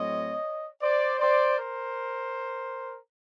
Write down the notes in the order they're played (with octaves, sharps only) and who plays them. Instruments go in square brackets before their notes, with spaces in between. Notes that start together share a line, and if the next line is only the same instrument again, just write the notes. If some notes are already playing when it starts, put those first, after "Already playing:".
Already playing: [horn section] A2 F#3 A3 C4 C#5 D#5
C5 D5
C5 D5
A#4 C5